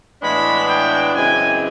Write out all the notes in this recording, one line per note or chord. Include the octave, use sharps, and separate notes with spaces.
A2 E3 G#3 B3 D4 B5
G5
F#2 C#3 E3 G#3 C4 G#5